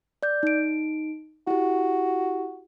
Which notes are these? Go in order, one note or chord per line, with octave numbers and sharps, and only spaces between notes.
D5 G6
D#4 D7
E4 F#4 G4